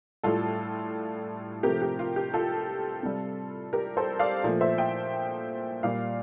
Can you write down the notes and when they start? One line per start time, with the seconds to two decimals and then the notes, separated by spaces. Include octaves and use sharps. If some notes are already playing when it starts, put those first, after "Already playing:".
0.23 A2 G3 F4 A4
1.63 C3 F3 A3 G4 A#4
1.82 G4
1.99 F4
2.16 G4
2.34 F4 A4
3.03 C3 G3
3.73 G4 A#4
3.97 A4 C5
4.19 D5 F5
4.44 A#2 F3 A3
4.61 C5 E5
4.78 E5 G5
5.83 A#2 G3 D5 F5